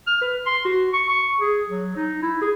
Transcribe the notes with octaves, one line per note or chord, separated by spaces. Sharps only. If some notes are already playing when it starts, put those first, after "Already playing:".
F6
B4
C6
F#4
C#6
C#6
G#4
F#3
D#4
E4
G#4